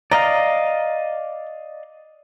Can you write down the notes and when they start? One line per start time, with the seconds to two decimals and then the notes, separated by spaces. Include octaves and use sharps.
0.11 D5 D#5 F5 A#5